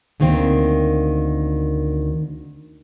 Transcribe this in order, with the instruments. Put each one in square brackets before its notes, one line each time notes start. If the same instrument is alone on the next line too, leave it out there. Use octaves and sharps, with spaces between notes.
[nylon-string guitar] D2 D#3 A#3 C4